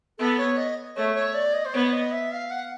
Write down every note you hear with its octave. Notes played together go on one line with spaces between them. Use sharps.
B3 A4
C#5
D#5
A3 C#5
C#5
D5
D#5
C5
B3 C#5
D#5
E5
F5
F#5